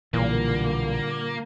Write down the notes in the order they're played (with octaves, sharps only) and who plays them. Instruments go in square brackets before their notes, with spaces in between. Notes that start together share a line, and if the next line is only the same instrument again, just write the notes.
[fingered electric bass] B1 E3 [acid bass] A#2 [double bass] D3 G3 [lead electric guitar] A#3